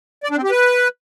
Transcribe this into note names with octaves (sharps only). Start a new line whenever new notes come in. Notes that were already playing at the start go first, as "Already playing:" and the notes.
D5
D4
C4
G4
B4